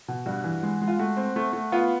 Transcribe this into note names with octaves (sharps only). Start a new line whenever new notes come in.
B2
G2 F#4
E3
G#3
G#3
F4
A3 F#4
C4
A3
A3
B3 F4